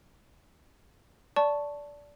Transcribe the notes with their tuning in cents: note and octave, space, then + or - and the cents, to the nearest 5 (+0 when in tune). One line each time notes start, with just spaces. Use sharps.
D5 -15 A5 +0 C#6 +0